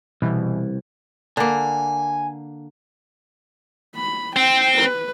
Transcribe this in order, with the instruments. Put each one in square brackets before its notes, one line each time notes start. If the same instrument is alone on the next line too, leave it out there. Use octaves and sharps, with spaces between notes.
[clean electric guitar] C2 [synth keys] B2 E3
[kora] D3 A#3 [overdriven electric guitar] G#5
[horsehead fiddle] B5
[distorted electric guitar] C4 [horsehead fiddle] G5
[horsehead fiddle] B4